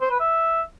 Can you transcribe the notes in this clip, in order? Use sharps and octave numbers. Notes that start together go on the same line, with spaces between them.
C5
B4
E5